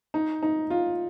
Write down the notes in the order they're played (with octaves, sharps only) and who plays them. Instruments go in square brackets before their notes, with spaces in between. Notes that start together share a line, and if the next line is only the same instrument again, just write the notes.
[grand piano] D#4
D#4
F4